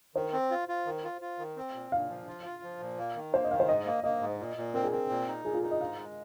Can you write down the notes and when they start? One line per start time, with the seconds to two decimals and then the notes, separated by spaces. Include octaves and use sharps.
0.15 D#3 C5
0.33 C4
0.51 F4
0.68 F4
0.86 D#3
1.04 F4
1.21 F4
1.39 D#3
1.56 C4
1.74 A#2
1.92 A#2 F5
2.09 F3
2.28 F4
2.45 F4
2.63 F3
2.80 A#2
2.98 A#3
3.15 D#3
3.33 A#3 C5
3.44 D#5
3.51 D#3 F5
3.60 C5
3.68 G#2 D#5
3.86 A#3
4.04 A#3 D#5
4.21 G#2
4.39 A#2
4.57 A#2
4.74 C4 A#4
4.84 G#4
4.92 C4 A#4
5.09 A#2
5.28 D#4
5.45 A#2 G#4
5.53 F4
5.63 D#4 G#4
5.71 D#5
5.80 G#2 F5
5.98 G#3